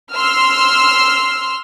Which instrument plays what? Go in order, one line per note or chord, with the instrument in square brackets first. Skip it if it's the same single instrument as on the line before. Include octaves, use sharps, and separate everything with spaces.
[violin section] C6 E6 F6